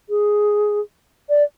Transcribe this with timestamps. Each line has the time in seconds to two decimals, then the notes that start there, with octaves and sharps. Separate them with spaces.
0.09 G#4
1.29 D5